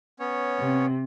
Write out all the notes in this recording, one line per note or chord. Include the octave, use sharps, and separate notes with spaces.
B3 C#4 C#5
C3